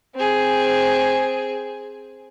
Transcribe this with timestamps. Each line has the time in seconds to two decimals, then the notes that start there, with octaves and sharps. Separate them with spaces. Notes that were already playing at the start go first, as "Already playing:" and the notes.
0.15 C4 G#4